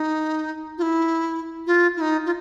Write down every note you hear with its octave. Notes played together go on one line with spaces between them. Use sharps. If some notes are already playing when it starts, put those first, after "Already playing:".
Already playing: D#4
F4
E4
F4
E4
D#4
F4